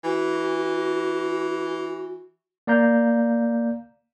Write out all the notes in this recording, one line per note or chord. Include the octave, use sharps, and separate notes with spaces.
E3 F#4
A#3 D5 F5 A#5 G6